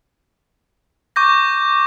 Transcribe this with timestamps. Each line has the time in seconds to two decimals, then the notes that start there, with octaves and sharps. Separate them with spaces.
1.16 C#6 D6 G6 A#6